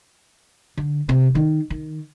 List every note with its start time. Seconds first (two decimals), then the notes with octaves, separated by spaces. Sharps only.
0.77 D3
1.09 C3
1.35 D#3
1.70 D#3